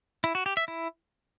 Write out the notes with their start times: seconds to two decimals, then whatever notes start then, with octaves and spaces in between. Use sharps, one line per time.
0.24 E4
0.35 F#4
0.46 G4
0.57 E5
0.68 E4